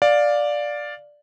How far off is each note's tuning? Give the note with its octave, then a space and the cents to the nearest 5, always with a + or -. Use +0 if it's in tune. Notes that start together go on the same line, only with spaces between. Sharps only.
D5 +0 F5 +15